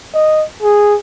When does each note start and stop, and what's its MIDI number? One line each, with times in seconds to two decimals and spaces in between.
0.14 0.44 75
0.62 0.96 68